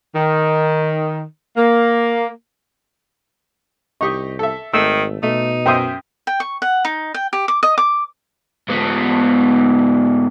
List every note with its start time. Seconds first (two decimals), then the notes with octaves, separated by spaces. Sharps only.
0.15 D#3
1.57 A#3
4.01 C2 D#4 G4 D#5 C#6
4.39 A4 E5
4.74 G#1 D#3 A3 E6
5.23 B2 A3 D#4
5.66 F#2 C5 E5 G5 C6 D#6
6.27 G5
6.40 C#6
6.62 F#5
6.85 D#4
7.14 G5
7.33 G4
7.48 D6
7.63 D#5
7.78 D6
8.69 G#2 B3